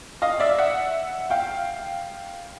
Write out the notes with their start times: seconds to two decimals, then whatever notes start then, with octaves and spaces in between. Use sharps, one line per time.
0.22 D#5 F5
0.40 D5 E5
0.58 E5 F#5
1.30 F5 G5